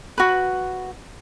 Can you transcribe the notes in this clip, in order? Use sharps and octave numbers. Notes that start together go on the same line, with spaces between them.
F#4 B4